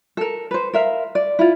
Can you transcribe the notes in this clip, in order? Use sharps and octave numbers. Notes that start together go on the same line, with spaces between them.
A4 A#4
B4 C5
A#4 E5 F5
D5
E4 F4